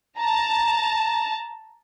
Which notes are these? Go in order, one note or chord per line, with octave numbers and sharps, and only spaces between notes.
A5 A#5